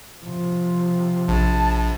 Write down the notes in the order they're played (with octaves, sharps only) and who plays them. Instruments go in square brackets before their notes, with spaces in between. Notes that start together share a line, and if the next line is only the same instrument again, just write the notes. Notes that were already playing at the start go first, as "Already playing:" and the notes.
[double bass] C3 F3
[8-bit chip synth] A#1 [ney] A5